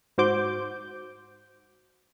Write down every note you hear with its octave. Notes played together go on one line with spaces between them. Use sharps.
G#2 F#4 C5 D6 G6